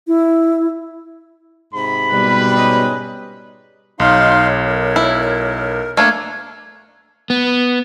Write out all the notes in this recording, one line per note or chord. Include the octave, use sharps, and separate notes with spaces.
E4
G#2 C3 B5
B2 G3 B4
G#2 C#4 D#5
B1 D#4 C#5 F5 C6
A#4
E4
A3 A#3 D4 G#6
B3